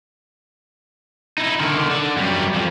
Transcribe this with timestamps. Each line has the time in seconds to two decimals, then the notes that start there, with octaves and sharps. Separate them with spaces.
1.38 D#4 E4
1.60 D3 D#3
1.90 D3
2.17 F#2 G3
2.54 F2 F3